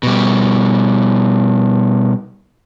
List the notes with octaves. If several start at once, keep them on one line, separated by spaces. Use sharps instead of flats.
B2 G3